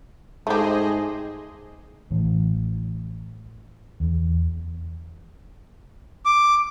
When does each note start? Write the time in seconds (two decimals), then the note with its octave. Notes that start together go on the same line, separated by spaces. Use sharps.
0.47 G#2 A3 G4 G#4 C5 D#5
2.11 A1 A2 E3
4.00 E2
6.25 D6